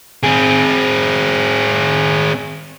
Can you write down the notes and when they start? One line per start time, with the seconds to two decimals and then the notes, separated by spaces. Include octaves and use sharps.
0.23 C4 G#4